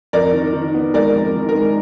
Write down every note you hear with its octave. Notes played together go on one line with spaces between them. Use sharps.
F2 A#4 D5
D#3
D#3
B3
G#3 A#4 D5
F2
D#3
A#4
G#3